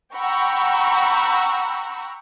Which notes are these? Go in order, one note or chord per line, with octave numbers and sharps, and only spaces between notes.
F#5 G5 A#5 B5 C#6 E6